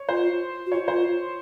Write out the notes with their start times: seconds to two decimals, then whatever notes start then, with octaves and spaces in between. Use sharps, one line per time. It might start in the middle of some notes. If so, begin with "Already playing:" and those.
Already playing: C#5
0.09 F4 C5
0.66 F#4
0.72 F4 C#5
0.88 F4 C5